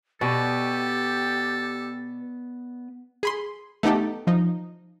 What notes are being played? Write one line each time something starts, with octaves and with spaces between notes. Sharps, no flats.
B2 B3 G4 A4 D5 D#5
G#4 B5 C6
A3 B3 D#4 G4 A4
F3 D#4